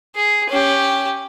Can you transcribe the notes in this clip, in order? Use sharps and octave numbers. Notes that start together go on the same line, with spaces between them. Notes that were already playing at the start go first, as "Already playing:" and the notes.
G#4
C#4 G4